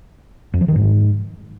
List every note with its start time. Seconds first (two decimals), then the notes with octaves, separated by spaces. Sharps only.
0.54 F2
0.61 F3
0.68 D#3
0.76 G#2